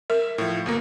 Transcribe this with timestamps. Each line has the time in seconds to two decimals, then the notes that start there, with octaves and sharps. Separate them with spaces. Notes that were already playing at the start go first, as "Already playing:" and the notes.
0.10 A#4 E5
0.38 A2 F3
0.66 G1 B2 A#3